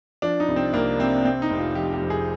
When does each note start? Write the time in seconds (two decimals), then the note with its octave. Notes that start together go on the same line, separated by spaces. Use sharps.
0.22 F3 D4
0.40 D#4
0.48 C2
0.56 C4
0.73 C2 A#3
0.99 C3 C4
1.25 C3 C4
1.42 D#4
1.50 F1
1.59 F4
1.75 F3 G4
1.93 G4
2.02 F2
2.10 G#4